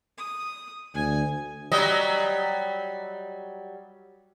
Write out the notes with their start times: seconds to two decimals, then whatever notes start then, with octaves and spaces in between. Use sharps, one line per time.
0.18 D#6
0.94 D2 G#5
1.72 F#3 G3 D#5